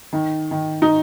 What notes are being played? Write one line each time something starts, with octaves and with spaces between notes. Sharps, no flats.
D#3
D#3
D#4